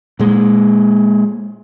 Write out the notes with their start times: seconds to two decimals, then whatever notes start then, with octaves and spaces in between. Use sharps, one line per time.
0.19 A#2 G#3